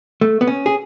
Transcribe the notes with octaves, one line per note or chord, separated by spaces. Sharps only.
A3
B3
C#4
G#4